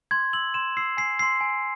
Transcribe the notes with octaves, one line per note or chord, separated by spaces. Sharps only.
C6 G#6
E6 F#7
C6 E7
E6 C7
G#5 C7
C6 E6 C7
G#5